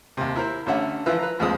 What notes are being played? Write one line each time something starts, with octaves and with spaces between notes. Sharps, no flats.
D#2 C3
E4 A#4 C5
A1 D3 C#4 E5 F#5
E3 F3 F4 B4 E5 E6
B4 A#5
A1 D#2 F3 G#3 C4 D#6